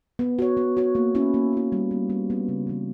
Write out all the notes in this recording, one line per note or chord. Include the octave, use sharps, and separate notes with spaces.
B3
F#4 C#5
B3
F#4 C#5
A#3
C#4 E4
A#3
C#4 E4
G3
B3 D4
G3
B3 D4
C#3
E3 B3